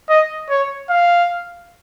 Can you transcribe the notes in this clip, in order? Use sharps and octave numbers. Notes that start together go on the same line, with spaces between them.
D#5
C#5
F5